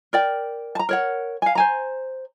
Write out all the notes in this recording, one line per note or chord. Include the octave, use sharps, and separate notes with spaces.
A#4 D5 G5
A5 A#5
A#4 C#5 F#5
F5 G#5
C5 G#5 A#5